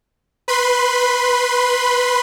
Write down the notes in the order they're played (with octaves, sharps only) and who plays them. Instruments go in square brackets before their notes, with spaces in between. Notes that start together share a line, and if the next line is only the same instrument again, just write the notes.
[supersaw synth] B4 B5 C6